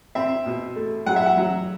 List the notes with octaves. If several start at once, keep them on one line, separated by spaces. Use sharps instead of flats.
C4 E5
B2
A3
F#3 F#5
E5
F#5
F#3